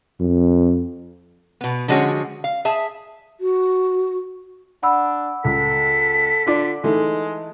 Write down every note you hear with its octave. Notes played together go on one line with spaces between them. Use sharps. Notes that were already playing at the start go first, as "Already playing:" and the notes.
F2
B2 B3
D3 F3 G#3 C#4 F#4 C#5
F5
G#4 E5 A5
F#4
D4 F#5 B5 E6
C#2 A4 B6
D3 D4 F4 D5
E3 G#3 A3 D#4